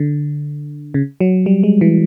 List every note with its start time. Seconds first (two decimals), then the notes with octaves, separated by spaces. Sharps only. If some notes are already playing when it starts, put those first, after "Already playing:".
Already playing: D3
0.94 C#3
1.20 F#3
1.46 G3
1.63 G#3
1.81 E3